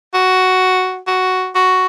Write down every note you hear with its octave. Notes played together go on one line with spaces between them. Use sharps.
F#4
F#4
F#4